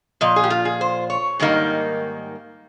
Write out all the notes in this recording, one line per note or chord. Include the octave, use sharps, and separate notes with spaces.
A#2 F3 D#5
G#4
G4
F4
G#4
C5
C#5
G#2 D#3 G3 A#3 D#4